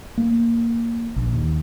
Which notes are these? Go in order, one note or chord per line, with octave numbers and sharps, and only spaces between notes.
A#3
A#1
D#2